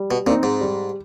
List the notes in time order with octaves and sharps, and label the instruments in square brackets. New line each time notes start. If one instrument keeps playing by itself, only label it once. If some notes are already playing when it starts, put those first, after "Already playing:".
Already playing: [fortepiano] G3
[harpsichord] B2
[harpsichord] A#2 [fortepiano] C4
[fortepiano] D#4
[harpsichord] G#2
[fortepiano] G3